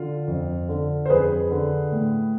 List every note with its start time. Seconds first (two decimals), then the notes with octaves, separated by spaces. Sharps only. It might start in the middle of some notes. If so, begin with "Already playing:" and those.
Already playing: D3 F4
0.28 F2
0.69 D3
1.06 C5
1.10 F2 G#4 B4
1.51 D3
1.92 A2